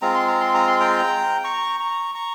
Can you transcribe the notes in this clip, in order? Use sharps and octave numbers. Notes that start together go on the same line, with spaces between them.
G#3 C4 F4 A#5
C6
A#5
C6
A#5
C6
G5 A#5
A#5 C#6
A#5 C#6
A#5 C#6